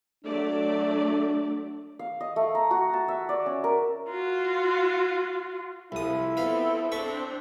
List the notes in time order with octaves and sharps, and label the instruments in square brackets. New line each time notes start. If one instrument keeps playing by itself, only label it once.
[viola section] F#3 A3 D5 [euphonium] D4
[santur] F5
D#5
A3
A#5
F#4
A5
E5
D5
C#4
A#4
[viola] F4 F#4
[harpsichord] C2 D#6 [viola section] F3 A4 [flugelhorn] E4
[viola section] B3 C4 A4 [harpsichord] B4 F5
[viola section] C4 D4 C5 [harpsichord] A4 E5 C#6